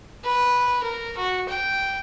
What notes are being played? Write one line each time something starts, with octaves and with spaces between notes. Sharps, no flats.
B4
A#4
F#4
G5